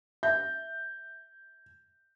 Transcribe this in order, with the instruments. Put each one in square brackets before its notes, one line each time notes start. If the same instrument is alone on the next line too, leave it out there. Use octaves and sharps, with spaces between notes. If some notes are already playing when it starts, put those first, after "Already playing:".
[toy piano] E5 [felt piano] G6